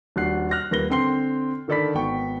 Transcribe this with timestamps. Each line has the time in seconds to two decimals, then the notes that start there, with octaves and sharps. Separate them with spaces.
0.16 D#1 D4 F#4 F#6 C7
0.51 F6 F#6 A#6
0.71 D#1 A#3 B4 A#6 G7
0.90 D3 C4 G5 C6 C7 G7
1.68 D3 D#3 A4 D5 B5 B6
1.95 G#1 B3 G5 C#6